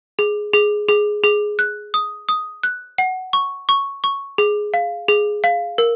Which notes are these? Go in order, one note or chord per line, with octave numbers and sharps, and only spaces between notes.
G#4
G#4
G#4
G#4
F#6
D#6
D#6
F#6
F#5
C#6
C#6
C#6
G#4
F5
G#4
F5
A#4